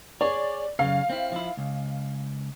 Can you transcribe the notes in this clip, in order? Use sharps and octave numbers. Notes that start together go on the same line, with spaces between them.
G#4 C#5 D5
F#2 C#3 F5
C4 E4
F3 E4
C#2